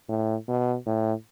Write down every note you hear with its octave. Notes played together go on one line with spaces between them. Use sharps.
A2
B2
A2